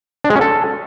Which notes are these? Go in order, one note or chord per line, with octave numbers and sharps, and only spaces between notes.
D4
G#3
C#4
A4